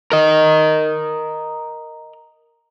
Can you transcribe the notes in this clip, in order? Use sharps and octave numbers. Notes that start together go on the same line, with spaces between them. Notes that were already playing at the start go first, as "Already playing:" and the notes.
A#4 D#5